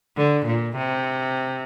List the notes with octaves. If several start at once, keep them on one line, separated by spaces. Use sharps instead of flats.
D3
A#2
C3